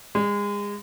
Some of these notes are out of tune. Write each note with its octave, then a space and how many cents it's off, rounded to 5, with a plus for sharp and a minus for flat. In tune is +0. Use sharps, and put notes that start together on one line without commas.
G#3 -30